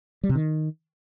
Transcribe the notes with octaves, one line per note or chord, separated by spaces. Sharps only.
G3
C3
D#3